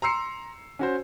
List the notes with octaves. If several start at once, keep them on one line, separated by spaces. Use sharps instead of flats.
A#5 C6 E6 C7 C#7
C#4 F#4 C5